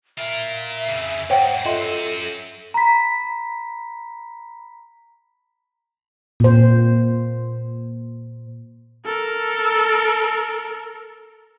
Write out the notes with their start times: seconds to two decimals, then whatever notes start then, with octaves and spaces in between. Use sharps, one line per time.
0.18 F4 A#4 E5
0.88 F2 C#3
1.30 G#2 C5 C#5 F#5 G5
1.65 F#2 F4 F#4 A4 D#5 E5 C6
2.74 A#5 B5 B6
6.40 A#2 C5
9.05 A4 A#4